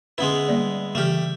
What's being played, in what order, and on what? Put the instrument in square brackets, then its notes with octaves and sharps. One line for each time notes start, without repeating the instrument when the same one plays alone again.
[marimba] D3 C#4 B4 [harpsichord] G#3 B3 E4
[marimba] G3 A#3 D5
[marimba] C#3 E3 F6 [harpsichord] A3 G4